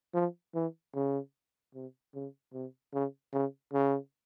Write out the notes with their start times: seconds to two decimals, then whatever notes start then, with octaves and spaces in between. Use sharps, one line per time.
0.14 F3
0.55 E3
0.95 C#3
1.74 C3
2.14 C#3
2.54 C3
2.93 C#3
3.33 C#3
3.73 C#3